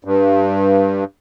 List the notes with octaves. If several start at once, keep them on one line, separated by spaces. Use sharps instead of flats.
G2